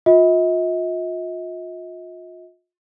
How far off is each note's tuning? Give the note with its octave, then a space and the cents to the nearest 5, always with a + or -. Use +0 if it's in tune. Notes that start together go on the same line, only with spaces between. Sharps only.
F4 +35 D#5 +45